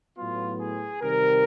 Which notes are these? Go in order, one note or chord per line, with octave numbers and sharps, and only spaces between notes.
A2 F#3 B3 F4
G#4
C3 D#3 G3 C4 A#4